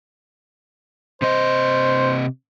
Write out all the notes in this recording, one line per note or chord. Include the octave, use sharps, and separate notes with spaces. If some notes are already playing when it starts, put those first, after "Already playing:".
C3 C5 D#5